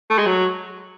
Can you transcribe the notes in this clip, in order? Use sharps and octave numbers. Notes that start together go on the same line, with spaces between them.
A3
G#3
F#3